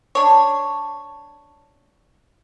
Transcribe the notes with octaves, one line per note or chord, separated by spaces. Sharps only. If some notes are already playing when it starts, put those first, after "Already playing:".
D4 C#5